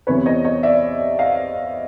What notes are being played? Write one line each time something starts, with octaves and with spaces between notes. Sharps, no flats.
E2 C3 E3 B4 C#5
C#5 D#5
C#5 D#5
D5 E5
D#5 F5